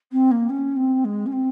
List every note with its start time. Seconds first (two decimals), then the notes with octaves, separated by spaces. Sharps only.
0.12 C4
0.31 A#3
0.49 C#4
0.76 C4
1.04 G#3
1.26 C#4
1.32 C4